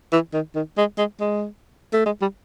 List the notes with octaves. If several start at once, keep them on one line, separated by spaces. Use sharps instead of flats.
E3
D#3
D#3
G#3
G#3
G#3
A3
G#3
G3